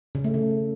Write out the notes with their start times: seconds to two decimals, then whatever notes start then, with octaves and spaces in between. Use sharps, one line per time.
0.15 C#3
0.24 A3
0.34 C#3